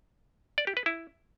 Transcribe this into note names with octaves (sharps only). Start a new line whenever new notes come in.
D5
G4
B4
E4